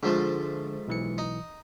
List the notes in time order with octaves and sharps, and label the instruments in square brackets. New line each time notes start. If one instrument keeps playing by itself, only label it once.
[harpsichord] G#2 F3 A3 [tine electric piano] D3
[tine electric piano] B1 E3 C#7
[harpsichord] D#4